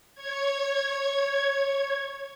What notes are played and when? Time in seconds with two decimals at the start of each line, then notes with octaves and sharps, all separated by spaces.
0.15 C#5 G#6